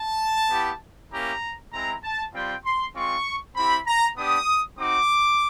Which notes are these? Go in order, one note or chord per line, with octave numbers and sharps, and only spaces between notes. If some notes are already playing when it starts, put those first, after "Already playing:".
Already playing: A5
B3 E4 G4
A#3 C#4 E4 G4 A#5
G#3 C4 E4 A#5
A5
G3 C4 F4 G5
C6
G#3 C4 F4 C#6
C4 E4 G4 B5
A#5
B3 D4 G4 D#6
C4 D#4 F#4 D6